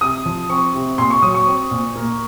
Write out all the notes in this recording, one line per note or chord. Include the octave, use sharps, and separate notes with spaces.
C3 D#6
F3
C4 C#6
C3
A#2 C6
C#6
F#3 D#6
C#6
C4
A#2
A#3